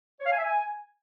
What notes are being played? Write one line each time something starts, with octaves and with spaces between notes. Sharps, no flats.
C#5
F5
G#5
E5
G#5